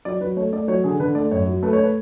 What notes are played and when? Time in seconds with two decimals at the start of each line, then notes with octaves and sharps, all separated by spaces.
0.05 F#3 D5
0.21 F#3 B4
0.37 A3 C#5
0.53 A3 D5
0.68 F#3 C#5
0.84 D3 G#4
1.00 D3 B4
1.15 A3 D5
1.31 F#2 C#5
1.47 F#3
1.63 A3 B4
1.73 C#5
1.79 A3 B4